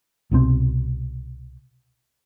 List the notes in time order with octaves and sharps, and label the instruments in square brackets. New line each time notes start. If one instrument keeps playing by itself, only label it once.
[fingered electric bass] C2 B2 E3 C4